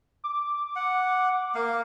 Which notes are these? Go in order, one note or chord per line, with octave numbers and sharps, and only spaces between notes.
D6
F#5
A#3 F5